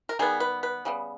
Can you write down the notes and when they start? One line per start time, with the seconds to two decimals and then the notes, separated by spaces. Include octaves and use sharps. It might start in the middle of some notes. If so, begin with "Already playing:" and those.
0.09 A#4
0.19 D#3 G3 B3 G#4
0.40 B4
0.63 B4
0.85 C#3 G3 B3